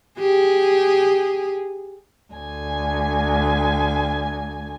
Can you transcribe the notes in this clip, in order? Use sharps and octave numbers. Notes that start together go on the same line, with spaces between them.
G4 G#4
D2 G#5